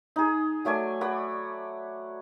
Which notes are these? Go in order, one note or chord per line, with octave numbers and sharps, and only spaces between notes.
D#4 G#4
F#3 A3 D5 G#5
D5 F#5 B5